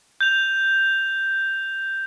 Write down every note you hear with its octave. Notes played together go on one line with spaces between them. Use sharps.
G6 F7